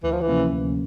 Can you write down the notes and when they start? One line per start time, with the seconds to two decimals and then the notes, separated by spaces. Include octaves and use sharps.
0.03 D2 E3
0.12 F3
0.21 E3
0.28 C3 F3 A#3 C#4
0.51 D2